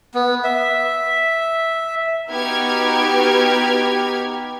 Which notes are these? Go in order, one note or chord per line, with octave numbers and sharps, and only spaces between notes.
B3
E5
B3 D#4 F#4 G4 F6 G#6